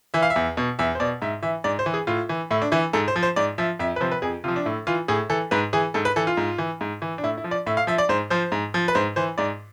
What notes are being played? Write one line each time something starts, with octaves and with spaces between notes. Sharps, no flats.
E3 E5
F5
E5
E2
B2
E2 E5
C5
B2 D5
G#2 E5
E3 E5
G#2 D5
C5
E3
G#4
A2 F4
E3
A2 E4
D4
E3 E4
G#2 A4
C5
F3
C5
G#2 D5
F3 E5
F2 E5
B4
C3 F3 C5
B4
F2 G#4
C3 F3 F4
D4
A2 E4
E3 F4
A2 G#4
E3 A4
G#2 B4
E3 G#4
G#2 A4
B4
E3 A4
F4
G#2
E3
G#2
E3
D4
A2 E4
E4
F3
D5
A2 E5
F5
F3 E5
D5
G#2 C5
F3 C5
G#2
F3
B4
G#2 C5
E3 C5
G#2 D5